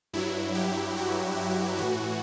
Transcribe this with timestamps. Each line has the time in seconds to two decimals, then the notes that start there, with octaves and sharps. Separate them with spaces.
0.13 G2 F#3 E4
0.55 G4
0.97 F#4
1.37 E4
1.78 A2 E3 F#4